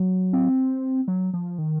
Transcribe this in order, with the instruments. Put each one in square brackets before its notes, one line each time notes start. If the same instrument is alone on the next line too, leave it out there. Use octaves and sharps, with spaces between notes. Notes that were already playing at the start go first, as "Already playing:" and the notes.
Already playing: [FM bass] F#3
[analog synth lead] C4
F#3
F3
D#3